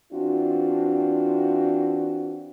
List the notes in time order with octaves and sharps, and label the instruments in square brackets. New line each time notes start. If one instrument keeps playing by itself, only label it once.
[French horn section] E3 C4 D4 F4 F#4